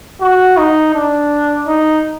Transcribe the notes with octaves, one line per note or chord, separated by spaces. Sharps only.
F#4
D#4
D4
D#4